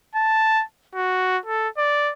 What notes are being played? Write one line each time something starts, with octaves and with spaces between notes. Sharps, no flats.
A5
F#4
A4
D5